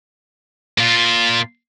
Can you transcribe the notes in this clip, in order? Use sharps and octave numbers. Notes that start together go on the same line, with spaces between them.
A#2 F4